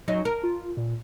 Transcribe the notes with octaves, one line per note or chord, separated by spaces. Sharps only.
F#2 F#3 D#4
A#4
F4
A#2